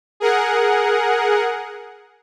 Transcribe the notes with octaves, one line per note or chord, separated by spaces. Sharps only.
G#4 A#4 F#5